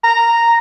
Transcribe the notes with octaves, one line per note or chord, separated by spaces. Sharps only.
A#5